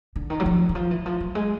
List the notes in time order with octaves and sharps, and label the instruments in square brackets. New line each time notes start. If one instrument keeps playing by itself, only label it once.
[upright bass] D3
D#3
F#3
F3
E3
F3
E3
F3
F#3
G#3